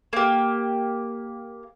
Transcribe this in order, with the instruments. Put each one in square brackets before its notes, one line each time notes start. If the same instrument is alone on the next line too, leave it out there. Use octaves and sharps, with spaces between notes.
[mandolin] A#3 G4